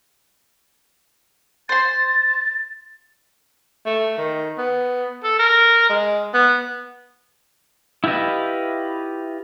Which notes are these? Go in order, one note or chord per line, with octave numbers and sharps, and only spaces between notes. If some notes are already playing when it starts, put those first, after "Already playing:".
C5 C6 A6
A3
D#3
B3
A4
A#4
G#3
B3
E4 F4 G4 B4 D#5